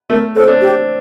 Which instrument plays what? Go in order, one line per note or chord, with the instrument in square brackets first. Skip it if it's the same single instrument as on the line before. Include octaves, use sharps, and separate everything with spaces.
[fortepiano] A3 [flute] A#4
[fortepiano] C4 [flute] A4
[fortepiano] D4
[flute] G4